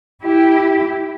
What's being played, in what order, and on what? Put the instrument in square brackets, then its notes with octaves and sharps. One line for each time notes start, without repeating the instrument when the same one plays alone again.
[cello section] E4 G4